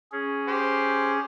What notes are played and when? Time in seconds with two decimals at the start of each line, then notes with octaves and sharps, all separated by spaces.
0.12 C#4 G#4
0.48 G4 C5